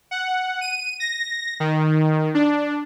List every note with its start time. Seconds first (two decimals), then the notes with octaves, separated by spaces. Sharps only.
0.11 F#5
0.61 D#7
1.00 A#6
1.60 D#3
2.34 D4